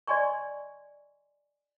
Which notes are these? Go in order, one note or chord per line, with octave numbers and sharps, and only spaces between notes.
D5 D#5 G#5 C6 C#6